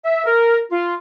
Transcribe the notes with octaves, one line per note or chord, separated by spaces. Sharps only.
E5
A#4
F4